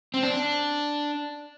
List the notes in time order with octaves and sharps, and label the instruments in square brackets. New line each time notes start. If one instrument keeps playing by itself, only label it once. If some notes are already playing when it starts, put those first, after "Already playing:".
[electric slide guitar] C4
D4